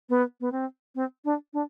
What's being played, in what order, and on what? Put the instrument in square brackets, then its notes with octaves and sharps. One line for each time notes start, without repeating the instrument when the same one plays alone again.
[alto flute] B3
B3
C4
C4
D4
D4